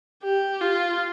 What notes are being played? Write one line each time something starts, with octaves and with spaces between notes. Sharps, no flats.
G4
F4